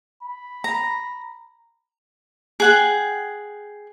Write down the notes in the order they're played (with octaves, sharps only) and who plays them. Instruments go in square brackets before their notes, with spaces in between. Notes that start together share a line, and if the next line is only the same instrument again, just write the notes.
[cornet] B5
[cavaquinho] A#5
G#4 F#5 G5